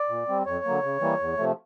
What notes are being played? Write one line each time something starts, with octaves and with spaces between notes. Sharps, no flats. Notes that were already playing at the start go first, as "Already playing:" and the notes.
Already playing: D5
A#2
G3 C4
F2 C#5
D3 F#3 A#3
C#3
E3 G3 A#3
E2
C3 F3 A3